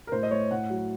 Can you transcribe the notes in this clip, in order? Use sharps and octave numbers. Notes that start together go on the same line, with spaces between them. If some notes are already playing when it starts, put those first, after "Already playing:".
A#4
A2 C5
D#5
A3 C#5
A2 F#5
F#3